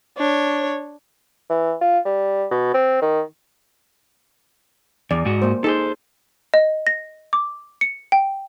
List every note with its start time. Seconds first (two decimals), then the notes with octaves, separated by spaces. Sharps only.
0.17 D4 C#5
1.50 E3
1.81 F4
2.05 G3
2.51 B2
2.74 C4
3.02 D#3
5.11 E2 D5
5.25 G#2 F#4
5.42 A#3 C5
5.64 D#4 G#4 A4 C5
6.54 D#5
6.87 A#6
7.33 D6
7.81 C#7
8.12 G5